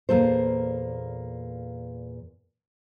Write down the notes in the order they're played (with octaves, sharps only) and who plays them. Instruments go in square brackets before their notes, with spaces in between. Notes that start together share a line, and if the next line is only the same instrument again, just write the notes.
[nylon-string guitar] E2 A#2 C#3 A#3 A4 C5